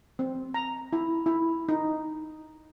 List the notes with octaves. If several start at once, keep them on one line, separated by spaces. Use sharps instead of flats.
C4
A#5
E4
E4
D#4